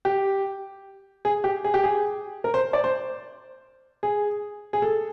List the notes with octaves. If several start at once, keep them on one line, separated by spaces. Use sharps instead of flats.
G4
G#4
G4
G#4
G4
G#4
A#4
C5
D5
C5
G#4
G#4
A4